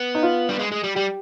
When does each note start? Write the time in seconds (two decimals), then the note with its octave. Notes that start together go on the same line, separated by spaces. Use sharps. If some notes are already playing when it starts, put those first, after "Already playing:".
Already playing: B3
0.15 D#4
0.23 F4
0.49 G3
0.59 G#3
0.72 G#3
0.83 G3
0.95 G3 G4